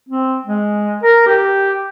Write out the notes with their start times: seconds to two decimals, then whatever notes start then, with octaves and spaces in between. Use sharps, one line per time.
0.09 C4
0.46 G#3
1.03 A#4
1.27 G4